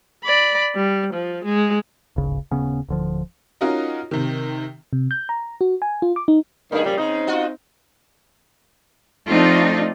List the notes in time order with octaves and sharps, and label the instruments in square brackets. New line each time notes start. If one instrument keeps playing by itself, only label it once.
[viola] D5 B5
G3
F3
G#3
[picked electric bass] D1 G#1 C#3
D#1 C#3 B3 C#4
D1 D3 F3
[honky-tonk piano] C#4 D#4 F4 F#4 A#4 D#5
C3 D#3
[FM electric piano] C3
G6
A#5
F#4
G#5
F4
D6
D#4
[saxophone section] G2 D#3 [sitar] A3 G#4
[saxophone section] A#2 F3 G3 [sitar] C#3
[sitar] C#3 [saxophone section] C4 D#4
[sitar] F4 F#4 D#5
[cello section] F3 A3 C4 D4 D#4 F4